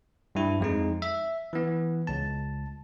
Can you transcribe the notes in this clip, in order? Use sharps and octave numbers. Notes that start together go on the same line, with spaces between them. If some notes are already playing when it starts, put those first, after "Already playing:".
G2 E4
F2 G#3 D#4
E5
E3 B3
C#2 A5